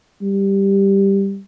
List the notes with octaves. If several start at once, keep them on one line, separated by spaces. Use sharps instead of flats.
G3